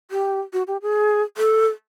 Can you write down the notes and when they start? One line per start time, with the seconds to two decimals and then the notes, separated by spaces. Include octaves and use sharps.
0.11 G4
0.53 F#4
0.67 G4
0.82 G#4
1.37 A4